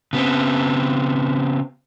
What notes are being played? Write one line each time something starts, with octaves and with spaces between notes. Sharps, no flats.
C#3 B3 C4